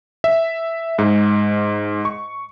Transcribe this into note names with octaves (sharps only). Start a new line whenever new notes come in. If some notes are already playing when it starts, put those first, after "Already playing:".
E5
G#2
C#6